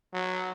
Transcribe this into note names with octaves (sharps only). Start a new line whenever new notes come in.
F#3